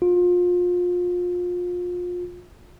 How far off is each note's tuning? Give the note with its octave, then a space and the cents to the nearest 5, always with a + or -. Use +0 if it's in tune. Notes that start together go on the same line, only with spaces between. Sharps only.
F4 +30